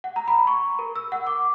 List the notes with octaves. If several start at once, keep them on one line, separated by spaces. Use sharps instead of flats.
F#5
A#5
B5
C#6
A#4
E6
F#5
D6